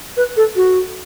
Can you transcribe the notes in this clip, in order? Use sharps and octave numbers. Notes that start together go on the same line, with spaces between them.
B4
A4
F#4